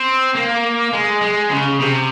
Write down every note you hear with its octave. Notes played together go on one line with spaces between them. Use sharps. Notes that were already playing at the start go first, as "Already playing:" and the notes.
Already playing: C4
A#3
G#3
G#3
C#3
C3